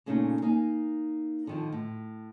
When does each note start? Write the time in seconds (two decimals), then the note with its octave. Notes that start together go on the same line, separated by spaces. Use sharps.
0.06 A#2 C#3 A3 B3 C#4 D#4
0.42 A#3 D#4 G#5
1.47 D3 D#3 F3
1.72 A2